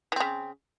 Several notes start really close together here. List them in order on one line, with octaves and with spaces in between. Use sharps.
E3 C4 C#3